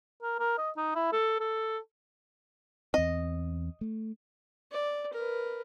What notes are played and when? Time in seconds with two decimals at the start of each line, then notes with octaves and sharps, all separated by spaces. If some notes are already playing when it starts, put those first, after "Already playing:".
0.23 A#4
0.39 A#4
0.58 D#5
0.77 D#4
0.95 E4
1.13 A4
1.40 A4
2.94 E2 C4 D#5
3.81 A3
4.71 D5
5.13 A#4 B4